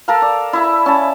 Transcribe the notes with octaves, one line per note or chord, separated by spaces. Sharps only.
A4 A#4 F5
D5
E4 E5 B5
C#4 A5